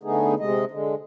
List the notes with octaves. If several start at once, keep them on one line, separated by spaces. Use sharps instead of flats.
D3 A3 B3 D#4 G#4
C3 G#3 D#5
D3 G#3